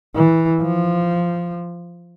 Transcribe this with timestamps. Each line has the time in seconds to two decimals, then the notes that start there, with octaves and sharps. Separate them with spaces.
0.15 E3
0.62 F3